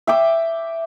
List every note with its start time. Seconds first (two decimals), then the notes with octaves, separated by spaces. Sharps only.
0.07 E5 G5 D6